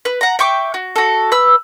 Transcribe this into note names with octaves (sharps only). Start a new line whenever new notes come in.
B4
F#5 A#5
E5 G5 C#6 D6
F#4
F#4 A4
B4 E6